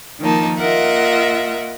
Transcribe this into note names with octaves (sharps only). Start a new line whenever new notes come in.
D#3 F3 A#3 D#4 A5
A#3 F4 A#4 D#5 E5 F#5